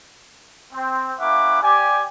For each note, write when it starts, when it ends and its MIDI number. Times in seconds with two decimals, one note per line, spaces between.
0.73 1.12 60
1.19 1.59 58
1.19 1.59 61
1.19 1.59 64
1.19 1.59 76
1.19 1.59 78
1.19 1.59 86
1.62 2.03 67
1.62 2.03 74
1.62 2.03 80